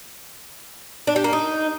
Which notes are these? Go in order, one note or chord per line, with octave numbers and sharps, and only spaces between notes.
D4
G4
A#3
D#4